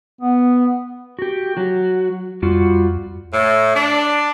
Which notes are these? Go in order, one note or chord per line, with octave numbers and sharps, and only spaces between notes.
B3
F#4 G4
F#3 F#4
F2 G3 F4 F#4
A2
D4